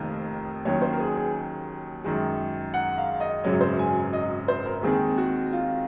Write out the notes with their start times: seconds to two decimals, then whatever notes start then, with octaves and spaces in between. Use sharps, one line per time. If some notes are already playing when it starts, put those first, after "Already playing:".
Already playing: F1 F2 D#3 A#3
0.65 D#2 D#3 F#3 C#4 C#5
0.82 C5
0.93 A#4
1.00 G#4
1.17 G#4
2.04 F#2 D#3 G#3
2.74 F#5
2.98 F5
3.20 D#5
3.44 G#1 F#2 C#3 F#3 C#4 C#5
3.61 C5
3.79 G#5
4.13 D#5
4.48 C5
4.66 A#4
4.83 D#2 D#3 G#3 C4 G#4
5.18 F#4
5.53 F4